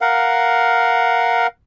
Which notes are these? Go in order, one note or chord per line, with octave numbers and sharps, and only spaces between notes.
A#4 F5 F#5